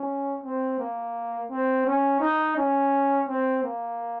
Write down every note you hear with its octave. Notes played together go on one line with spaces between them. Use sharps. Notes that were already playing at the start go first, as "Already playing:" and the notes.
Already playing: C#4
C4
A#3
C4
C#4
D#4
C#4
C4
A#3